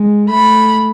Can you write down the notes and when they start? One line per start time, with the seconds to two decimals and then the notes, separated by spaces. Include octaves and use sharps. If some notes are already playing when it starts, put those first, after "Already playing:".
Already playing: G#3
0.30 A3 B5